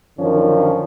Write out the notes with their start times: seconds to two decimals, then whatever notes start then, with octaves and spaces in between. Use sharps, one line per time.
0.19 F#2 D3 D#3 F3 C#4